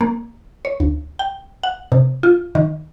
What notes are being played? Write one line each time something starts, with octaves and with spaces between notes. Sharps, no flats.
A#3
C#5
D2
G5
F#5
C3
F4
D#3